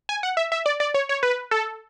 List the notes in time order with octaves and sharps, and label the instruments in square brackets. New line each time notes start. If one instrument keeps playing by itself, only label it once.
[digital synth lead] G#5
F#5
E5
E5
D5
D5
C#5
C#5
B4
A4